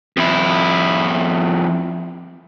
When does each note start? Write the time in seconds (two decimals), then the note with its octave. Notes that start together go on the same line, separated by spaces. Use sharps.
0.17 F2 E4